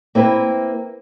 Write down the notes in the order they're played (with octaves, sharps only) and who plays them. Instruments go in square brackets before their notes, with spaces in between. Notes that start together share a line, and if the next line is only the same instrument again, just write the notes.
[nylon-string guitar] A#3 C4 E4 B4